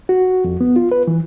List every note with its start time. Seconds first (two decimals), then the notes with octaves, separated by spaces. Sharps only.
0.09 F#4
0.44 F2
0.61 B3
0.76 F4
0.92 B4
1.07 E3